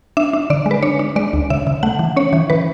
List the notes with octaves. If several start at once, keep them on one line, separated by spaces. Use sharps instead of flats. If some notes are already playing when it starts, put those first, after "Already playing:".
D4 E5
D4
D3 D5
G#3
B4
D4 C#5
D4
G#3 D5
D2
C#3 E5
C#3
A3 F#5
E3
C#4 C#5
E3
E3 B4